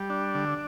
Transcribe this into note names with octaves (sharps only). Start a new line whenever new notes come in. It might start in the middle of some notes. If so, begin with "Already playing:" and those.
Already playing: G3
D4
D3